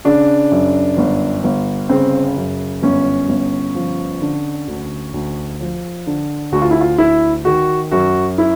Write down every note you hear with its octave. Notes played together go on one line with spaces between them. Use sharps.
C#3 D4
F#2
G1
G1
C#3 C4
F#2
G1 C#4
G1
F3
D3
D2
D2
F3
D3
D2 F#4
F4
E4
F4
D2 E4
D#3 F#4
F#2 F#4
E4